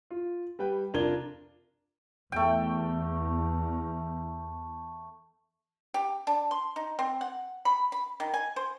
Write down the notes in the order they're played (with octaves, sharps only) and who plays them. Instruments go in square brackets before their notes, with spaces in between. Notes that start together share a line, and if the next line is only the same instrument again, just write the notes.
[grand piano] F4
G3 B4 G5
F1 D4 F4 A#4 G#6 G7
[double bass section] E2 [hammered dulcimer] A3 G5
[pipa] G4
D4
C6
D#4
C4
F#5
B5
B5
D#3
G#5
C5